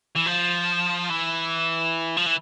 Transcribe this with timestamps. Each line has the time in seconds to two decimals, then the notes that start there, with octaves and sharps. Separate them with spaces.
0.16 E3
0.27 F3
1.10 E3
2.17 F3
2.26 E3